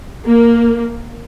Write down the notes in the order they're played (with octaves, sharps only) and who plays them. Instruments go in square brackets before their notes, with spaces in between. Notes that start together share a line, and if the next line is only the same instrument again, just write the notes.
[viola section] A#3